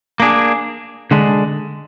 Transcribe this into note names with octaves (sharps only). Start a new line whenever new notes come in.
A#3 D4 G#4
D3 G#3 D4